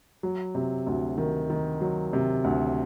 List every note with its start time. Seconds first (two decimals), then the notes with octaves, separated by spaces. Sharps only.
0.23 F#3
0.55 C3
0.87 D2
1.18 D#3
1.50 D#3
1.81 F#3
2.13 C3
2.44 D2